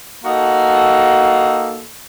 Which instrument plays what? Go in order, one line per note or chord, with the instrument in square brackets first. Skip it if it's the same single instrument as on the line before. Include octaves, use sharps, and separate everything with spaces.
[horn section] A#3 D#4 F#4 A4